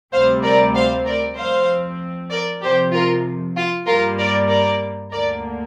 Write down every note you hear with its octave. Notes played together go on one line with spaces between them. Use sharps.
D2 C3 G3 C4 C5 F5
A#4 D5
C5 F5
A#4 D5
F2 F3 C4 C5 F5
A#4 D5
F2 C3 F3 G4 C5
F4 A#4
F4
G2 G3 A#3 F4 A#4
A#4 D5
A#4 D5
D2 D3 A#3 A#4 D5